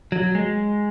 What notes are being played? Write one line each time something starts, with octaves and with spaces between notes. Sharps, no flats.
F#3
G#3